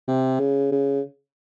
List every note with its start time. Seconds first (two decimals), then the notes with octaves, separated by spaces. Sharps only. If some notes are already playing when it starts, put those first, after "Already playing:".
0.08 C3
0.40 C#3
0.72 C#3